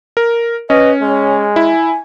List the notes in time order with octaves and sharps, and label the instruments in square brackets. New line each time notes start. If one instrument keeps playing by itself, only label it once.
[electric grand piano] A#4
[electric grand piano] C#4 [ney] B4 [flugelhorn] D#5
[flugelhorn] G#3 [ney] C#5
[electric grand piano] E4 [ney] G#5